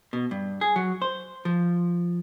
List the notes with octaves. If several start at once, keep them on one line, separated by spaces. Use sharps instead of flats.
B2
G2
G#4
F#3
C5
F3